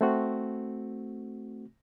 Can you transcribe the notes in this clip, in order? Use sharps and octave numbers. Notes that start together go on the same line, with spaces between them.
A3 C4 F#4